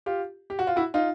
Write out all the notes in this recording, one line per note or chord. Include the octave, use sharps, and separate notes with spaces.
F4 G4
G4
F#4
F4
E4 F#4
D#4 F4